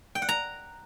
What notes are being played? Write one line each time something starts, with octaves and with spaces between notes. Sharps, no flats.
G5
F#5
A#5